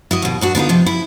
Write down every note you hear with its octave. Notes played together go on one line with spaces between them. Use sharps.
E4 F#4 D#5
D#2 B2
F#2 D4 F#4
D3 B3 D#4 F4
C3 F3
E4